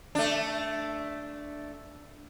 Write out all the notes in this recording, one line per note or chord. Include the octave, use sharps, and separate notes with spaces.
A3 D4